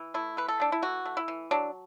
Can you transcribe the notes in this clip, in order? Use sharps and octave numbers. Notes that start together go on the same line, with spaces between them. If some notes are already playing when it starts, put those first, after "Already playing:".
Already playing: E3
A3 E4
E3 B4
A4
A3 D4
E4
E3 F#4
A3
E4
E3
F#3 D4